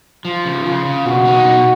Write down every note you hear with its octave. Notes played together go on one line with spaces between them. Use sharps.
F3 F4
C#3
C#3 F4
C#3
B2 F#4
D#4
B2